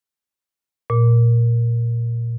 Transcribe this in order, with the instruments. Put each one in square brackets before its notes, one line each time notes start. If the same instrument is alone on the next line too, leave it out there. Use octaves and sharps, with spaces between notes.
[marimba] A#2